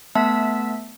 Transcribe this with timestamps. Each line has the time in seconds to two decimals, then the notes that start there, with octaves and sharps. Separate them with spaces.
0.15 A3 B3 E5 A5 E6 B6